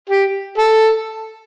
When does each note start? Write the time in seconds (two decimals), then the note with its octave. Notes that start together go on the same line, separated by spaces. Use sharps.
0.09 G4
0.58 A4